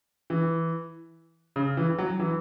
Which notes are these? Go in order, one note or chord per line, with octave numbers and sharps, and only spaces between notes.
E3
C#3
E3
F#3
E3